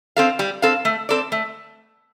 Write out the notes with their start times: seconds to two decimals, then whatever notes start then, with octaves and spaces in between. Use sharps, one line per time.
0.17 C4 A4 F5
0.39 G3
0.62 C4 A4 F5
0.85 A3
1.09 C4 A4 D5
1.32 A3